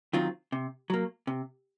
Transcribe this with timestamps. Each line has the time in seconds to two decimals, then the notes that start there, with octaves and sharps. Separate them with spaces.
0.13 D#3 F#3 C4 F4
0.52 C3
0.90 F#3 A#3
1.27 C3